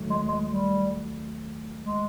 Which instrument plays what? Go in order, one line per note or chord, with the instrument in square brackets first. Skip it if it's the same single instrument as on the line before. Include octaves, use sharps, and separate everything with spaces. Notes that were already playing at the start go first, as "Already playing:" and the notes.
Already playing: [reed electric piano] D#2 D#3 F#3 A3
[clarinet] G#3
G#3
G3
G#3